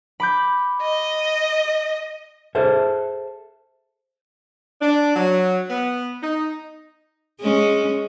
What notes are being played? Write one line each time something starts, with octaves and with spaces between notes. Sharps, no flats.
B5 D6 G6
D#5
G#4 A4 C5 E5
D4
F#3
B3
D#4
G#3 C#4